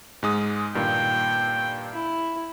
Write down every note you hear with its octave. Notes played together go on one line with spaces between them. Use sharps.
G#2 G#3 D#6
G2 A#2 D#3 G5
E4